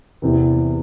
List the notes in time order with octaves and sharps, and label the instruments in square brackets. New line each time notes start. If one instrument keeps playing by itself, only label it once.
[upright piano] E2 C3 E3